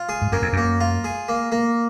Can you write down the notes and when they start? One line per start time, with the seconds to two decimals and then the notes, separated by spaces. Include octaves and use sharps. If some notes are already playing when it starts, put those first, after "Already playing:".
Already playing: F4
0.09 G#4
0.22 G#2
0.32 F#2 A#3
0.42 F2
0.53 F#2 A#3
0.81 F4
1.04 G#4
1.29 A#3
1.52 A#3